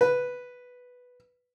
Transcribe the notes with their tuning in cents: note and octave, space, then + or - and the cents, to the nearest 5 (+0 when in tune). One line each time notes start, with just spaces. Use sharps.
B4 +0